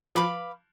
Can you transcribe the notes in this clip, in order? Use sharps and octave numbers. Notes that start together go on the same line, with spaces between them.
F3 B4 F5 B5 D6